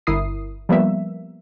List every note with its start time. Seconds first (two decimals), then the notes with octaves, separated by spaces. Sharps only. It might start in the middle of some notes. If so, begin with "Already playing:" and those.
0.07 G1 E4 A#4 D#6 C7
0.69 F3 G3 A#3 B3 E5